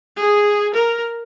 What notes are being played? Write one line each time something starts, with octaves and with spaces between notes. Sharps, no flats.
G#4
A#4